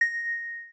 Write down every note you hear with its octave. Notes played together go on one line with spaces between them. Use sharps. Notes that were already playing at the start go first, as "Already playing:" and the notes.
A#6